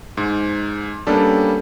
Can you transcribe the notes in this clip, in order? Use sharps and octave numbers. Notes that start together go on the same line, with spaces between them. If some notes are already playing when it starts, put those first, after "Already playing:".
G#2
G3 A#3 B3 C#4 D4 A4